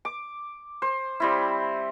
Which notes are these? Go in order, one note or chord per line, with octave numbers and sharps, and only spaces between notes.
D6
C5
G3 C4 E4